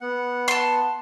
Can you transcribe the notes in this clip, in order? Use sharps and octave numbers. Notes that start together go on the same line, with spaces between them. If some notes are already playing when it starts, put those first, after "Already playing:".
B3 F#5
A5 C6